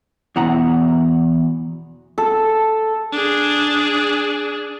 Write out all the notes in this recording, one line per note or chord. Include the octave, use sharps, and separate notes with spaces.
E2 B2 E4 F#5 A#5
A4
D4 G#4